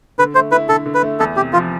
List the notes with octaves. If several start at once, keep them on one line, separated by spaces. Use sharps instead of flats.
D3 B4
A3 C5
E4 B4
D3 A4
D3
B4
A3
E2 A4
C3 G4
F3 F4